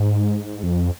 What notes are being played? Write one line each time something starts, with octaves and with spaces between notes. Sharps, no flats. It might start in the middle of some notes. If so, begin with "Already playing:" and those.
Already playing: G#2
F2